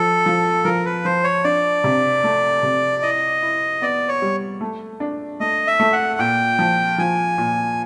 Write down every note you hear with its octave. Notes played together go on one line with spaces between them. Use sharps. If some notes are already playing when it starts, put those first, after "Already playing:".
Already playing: F3 A4
F3
F3 A#4
B4
F3 C5
C#5
D4 D5
C3
A3
C3
E4 D#5
E4
B3 D5
C#5
G3
A3
D4
A3 D#5
E5
A3
F#5
A#2 G5
F3
F3 G#5
A#2